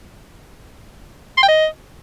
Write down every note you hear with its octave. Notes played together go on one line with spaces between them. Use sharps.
C6
G5
D#5